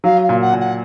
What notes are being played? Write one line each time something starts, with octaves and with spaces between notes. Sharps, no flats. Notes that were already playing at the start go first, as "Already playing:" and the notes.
F#3 F5
F5
A#2
F#5
A#2
F#5